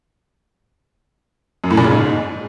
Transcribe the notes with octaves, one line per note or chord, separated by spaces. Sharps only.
F#2
A2
A#2
C#3
G#2